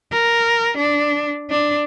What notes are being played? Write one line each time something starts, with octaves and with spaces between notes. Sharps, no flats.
A#4
D4
D4